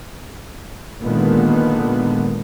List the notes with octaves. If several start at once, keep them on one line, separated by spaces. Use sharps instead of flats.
A#2 D3 D#3 G#3 B3